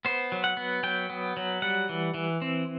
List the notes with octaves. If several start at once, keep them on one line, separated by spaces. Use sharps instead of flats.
B3 C5
F#3
F#5
B3
F#3 G5
B3
F#3
G3 F#5
E3
E3
C4